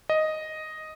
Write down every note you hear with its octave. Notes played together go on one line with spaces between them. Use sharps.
D#5